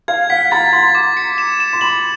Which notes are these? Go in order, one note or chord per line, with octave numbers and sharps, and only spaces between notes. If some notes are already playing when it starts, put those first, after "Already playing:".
F5 G#6
F#5 B6
A#5 A6
C6 A6
D6
C#7
E7
E7
C6
B5 F#7